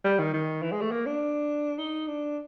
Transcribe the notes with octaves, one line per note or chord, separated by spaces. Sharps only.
G3
D#3
D#3
E3
G#3
A3
A#3
D4
D#4
D4